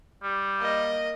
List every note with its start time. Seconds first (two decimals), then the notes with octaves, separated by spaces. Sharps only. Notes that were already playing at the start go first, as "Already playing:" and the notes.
0.23 G3
0.60 A#3 D#5